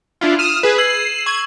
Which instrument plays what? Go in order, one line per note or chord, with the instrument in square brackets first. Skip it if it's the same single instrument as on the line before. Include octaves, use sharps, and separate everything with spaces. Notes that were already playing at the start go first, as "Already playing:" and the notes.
[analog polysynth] D4 E4 F4
[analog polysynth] D#6 F6 [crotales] D#7 E7
[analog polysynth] G#4 B4
[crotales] E6 G#6 F#7 [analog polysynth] C7
[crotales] C#6 [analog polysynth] G#6